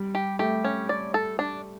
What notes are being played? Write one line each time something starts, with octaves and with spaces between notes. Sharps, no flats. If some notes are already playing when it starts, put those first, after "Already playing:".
Already playing: G3
G4
A3 G4
C#4
D5
A4
D4